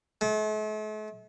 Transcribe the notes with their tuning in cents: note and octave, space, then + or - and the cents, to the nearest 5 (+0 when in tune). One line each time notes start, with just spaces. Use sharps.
A3 -45